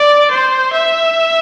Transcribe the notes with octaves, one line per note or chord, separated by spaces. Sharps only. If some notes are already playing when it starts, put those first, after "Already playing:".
Already playing: D5
C5
E5